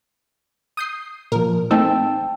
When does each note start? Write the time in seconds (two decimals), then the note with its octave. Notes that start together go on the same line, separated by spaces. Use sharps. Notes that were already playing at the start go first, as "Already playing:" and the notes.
0.77 D#6 G6 C7
1.32 A#2 F3 A#4
1.71 A3 C4 D#4 G5 A5 E6